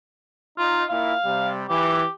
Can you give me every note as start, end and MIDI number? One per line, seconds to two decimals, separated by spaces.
0.59 0.84 63
0.59 0.84 65
0.90 1.14 46
0.90 1.14 64
0.90 1.50 77
1.24 1.64 48
1.24 1.64 55
1.69 2.03 52
1.69 2.09 67